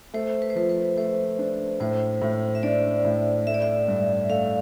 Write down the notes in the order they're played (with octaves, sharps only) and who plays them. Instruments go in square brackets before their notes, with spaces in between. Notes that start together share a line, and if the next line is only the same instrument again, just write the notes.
[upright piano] A3 [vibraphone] C5
[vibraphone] B4
C5
[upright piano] F3 [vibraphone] B4
[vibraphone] B4
[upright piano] A3 [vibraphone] C5
[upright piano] D4
[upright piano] A2 [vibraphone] C5
[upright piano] A2
[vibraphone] E5
[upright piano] D4 [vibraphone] D5
[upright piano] A2
[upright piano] A3 [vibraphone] E5
[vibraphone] D5
E5
[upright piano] G2
[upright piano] A3 [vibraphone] F5